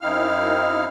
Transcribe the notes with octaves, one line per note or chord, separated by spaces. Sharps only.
F#2 C4 D#4 E4 F5 F6